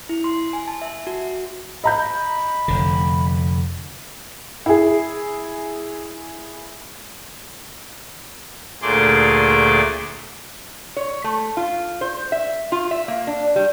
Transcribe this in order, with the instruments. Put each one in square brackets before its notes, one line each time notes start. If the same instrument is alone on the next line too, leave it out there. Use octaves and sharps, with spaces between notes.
[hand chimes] E4
C6
G#5
A5
E5
F#4
[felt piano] D#5 A#5 G6 [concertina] B5
[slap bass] F1 D3
[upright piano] E4 G#4
[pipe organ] D2 A#2 A3 G#4 C6 D6
[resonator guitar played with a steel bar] C#5
A3
F4
C5
E5
F4
E5
A#3
D4
G3